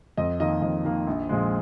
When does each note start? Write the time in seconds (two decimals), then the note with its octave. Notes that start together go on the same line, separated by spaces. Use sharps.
0.17 F2 D#5
0.40 D#3 A#3 D#5
0.62 F2 D#5
0.85 D#3 A#3
1.07 A#1
1.29 A#2 F3 G#3